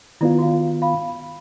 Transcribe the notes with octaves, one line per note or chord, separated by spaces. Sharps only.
D#3 B3 E4 F4 D5
F#4 F5
F5 B5